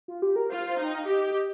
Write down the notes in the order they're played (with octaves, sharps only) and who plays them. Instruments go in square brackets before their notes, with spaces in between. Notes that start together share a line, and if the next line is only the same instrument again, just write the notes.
[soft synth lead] F4
G4
A#4
[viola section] F4 [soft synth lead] C5
[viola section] D#4
[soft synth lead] G5
F5
[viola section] G4 [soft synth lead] D#5